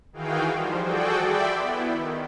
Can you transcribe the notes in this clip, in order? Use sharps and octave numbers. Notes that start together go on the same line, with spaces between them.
D#3 E3 F#4 G#4 F5 G5
F3 G3 C5
F#4 G#4 A4 D5 G5
D5 E5 G5 B5 C6
B3 E4
D#3